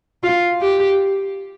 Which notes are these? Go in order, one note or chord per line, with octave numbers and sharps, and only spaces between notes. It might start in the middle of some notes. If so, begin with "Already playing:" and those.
F4
G4